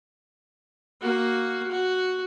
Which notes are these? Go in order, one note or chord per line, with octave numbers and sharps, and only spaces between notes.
A#3 F#4
F#4